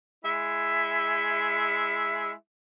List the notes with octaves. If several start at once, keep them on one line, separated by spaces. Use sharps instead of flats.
G#3 E4 E5